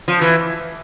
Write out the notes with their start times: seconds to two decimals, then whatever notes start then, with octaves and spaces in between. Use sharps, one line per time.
0.08 F3
0.21 E3